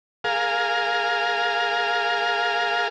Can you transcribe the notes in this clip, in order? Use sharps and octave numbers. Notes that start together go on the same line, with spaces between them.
G#4 A#4 F5